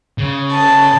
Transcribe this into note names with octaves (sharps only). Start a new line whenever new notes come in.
C#3
A5